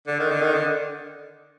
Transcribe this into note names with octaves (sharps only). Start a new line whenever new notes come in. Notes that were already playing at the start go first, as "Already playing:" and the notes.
D3
D#3
D3
D#3
D3